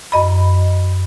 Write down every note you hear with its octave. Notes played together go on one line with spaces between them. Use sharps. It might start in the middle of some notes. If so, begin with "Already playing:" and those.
F#2 D#5 B5